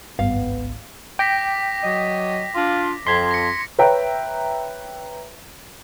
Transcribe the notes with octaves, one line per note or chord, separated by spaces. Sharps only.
G#1 C#2 G2 B3 F5
G5 D6 A#6 B6
F#3 D#5
D4 F4
F2 C6 G#6 B6
A#6 C#7
B4 C#5 E5 G5 A#5